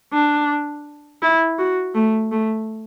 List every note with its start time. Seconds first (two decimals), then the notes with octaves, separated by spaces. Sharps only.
0.13 D4
1.22 E4
1.58 F#4
1.95 A3
2.31 A3